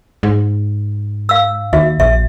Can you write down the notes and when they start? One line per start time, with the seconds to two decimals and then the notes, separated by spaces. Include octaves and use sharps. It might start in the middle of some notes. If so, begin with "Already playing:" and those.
0.23 G#2
1.29 F5 E6
1.73 D#2 F#4 E5
2.00 A#1 E5